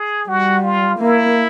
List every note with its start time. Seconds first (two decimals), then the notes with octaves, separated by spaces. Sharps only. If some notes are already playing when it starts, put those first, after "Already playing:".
Already playing: G#4
0.28 G3 F#4
0.64 F4
0.99 A#3 E4